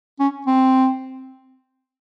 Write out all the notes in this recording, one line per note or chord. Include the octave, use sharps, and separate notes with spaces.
C#4
C4